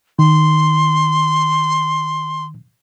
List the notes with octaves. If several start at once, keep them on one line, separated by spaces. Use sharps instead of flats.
D#3 C6